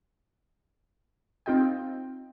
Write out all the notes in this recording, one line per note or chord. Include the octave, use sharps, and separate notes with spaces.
C4 D#4 F4 D#5 G5